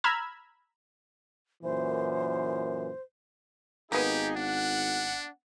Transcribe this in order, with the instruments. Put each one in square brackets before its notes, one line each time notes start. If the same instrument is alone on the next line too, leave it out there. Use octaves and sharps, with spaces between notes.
[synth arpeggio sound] A#5 B5 E6 F6 G#6
[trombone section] F#2 A#2 E3 [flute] C5
[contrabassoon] G#1 [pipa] A#3 B3 [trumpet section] D#4 G#4 [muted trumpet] G4
[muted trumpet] D4 [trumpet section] F#5